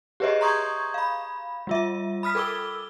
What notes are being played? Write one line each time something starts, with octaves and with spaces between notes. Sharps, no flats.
G4 G#4 B4 C#5 D#5 E5
A#5 C6 C#6 D#6 G6 G#6
F5 B5
G3 F4 E5
B5 D#6 F6 B6
A4 A#4 D6 E6 G7